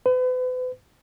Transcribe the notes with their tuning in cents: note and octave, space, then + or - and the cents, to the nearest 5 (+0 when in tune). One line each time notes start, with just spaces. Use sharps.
B4 +40